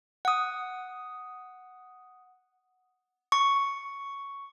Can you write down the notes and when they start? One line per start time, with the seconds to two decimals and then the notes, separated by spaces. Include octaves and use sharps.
0.25 F#5 D#6
3.32 C#6